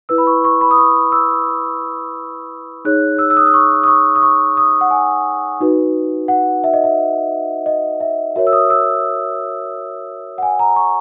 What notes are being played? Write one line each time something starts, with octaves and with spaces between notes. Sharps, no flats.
E4 B4 E6
B5
C#6
C#6
B5
D#6
C#6
E6
D#4 G#4 C#5 F#6
E6
E6
D#6
D#6
C#6
D#6
C#6
D#6
C#6
D#6
F#5
G#5
D#4 F#4 B4
F#5
E5
D#5
E5
D#5
E5
F#4 A#4 C#5 E5
E6
D#6
E6
F#5
G#5
A#5
C#6